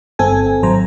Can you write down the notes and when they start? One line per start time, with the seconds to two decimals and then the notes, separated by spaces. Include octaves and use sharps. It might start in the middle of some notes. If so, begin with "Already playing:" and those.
0.19 G1 C4 A4 G#5
0.63 G#1 F#3 C5 A#5